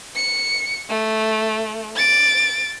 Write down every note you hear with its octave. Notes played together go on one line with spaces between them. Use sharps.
C#7
A3
A6 D7